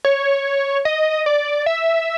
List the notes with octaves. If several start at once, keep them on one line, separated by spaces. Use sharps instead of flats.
C#5
D#5
D5
E5